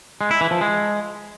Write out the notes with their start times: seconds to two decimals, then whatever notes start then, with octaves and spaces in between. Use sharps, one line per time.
0.21 G#3
0.31 E4
0.41 E3
0.51 F3
0.61 G#3